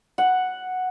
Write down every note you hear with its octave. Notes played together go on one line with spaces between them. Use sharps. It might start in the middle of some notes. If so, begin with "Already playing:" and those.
F#5